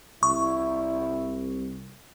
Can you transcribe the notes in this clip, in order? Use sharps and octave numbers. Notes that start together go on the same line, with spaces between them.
C2 E4 C#6